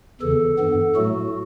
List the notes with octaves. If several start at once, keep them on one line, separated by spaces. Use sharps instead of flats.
E2 C#3 E3 A4
G2 E3 B3
A2 F#3 A3 F#4